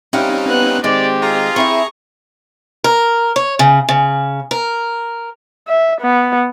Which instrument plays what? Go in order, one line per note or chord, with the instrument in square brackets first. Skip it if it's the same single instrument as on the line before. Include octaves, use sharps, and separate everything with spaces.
[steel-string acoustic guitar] G3 F5 F#5 [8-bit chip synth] C4 C#4 D#4
[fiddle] B3 F#6
[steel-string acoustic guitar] D#3 G#3 [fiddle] C4 G4 [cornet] D5
[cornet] F4 [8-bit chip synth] G#4 A#5
[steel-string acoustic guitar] C4 E4 C5 [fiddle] C#6
[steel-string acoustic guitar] A#4
C#5
C#3
C#3
A#4
[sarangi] E5
B3